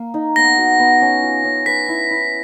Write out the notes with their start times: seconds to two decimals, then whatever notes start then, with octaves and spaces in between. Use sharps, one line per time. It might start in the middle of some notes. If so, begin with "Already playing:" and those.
Already playing: A#3
0.14 D#4
0.36 B3 A#6
0.58 F#4
0.79 B3
1.02 C#4
1.23 F4
1.44 C#4
1.66 B4 B6
1.88 E4
2.11 E4